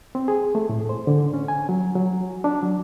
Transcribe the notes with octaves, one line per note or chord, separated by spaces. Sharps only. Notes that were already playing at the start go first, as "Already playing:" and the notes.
C4
G#4
A3
A2
C5
D3
C#4
G#5
F#3
F#3
D4
F#3